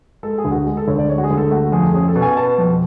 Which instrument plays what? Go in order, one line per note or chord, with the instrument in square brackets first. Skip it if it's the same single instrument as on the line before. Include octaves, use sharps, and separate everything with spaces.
[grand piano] G#3 A4
G#4
D2
F#4
G#3 G#4
A4
D2 C#5
D5
G#3 C#5
F#4
G#4
D2
A4
A3 F#4
F2 G#4
C#4 G#4
A4
B2
G#5
B3 A5
F2